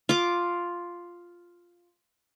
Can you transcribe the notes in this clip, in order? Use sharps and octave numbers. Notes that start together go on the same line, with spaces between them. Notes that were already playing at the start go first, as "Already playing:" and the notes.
F4 D6